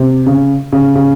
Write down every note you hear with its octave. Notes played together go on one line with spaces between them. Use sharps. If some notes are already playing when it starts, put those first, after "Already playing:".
Already playing: C3
C#3
C#3
C#3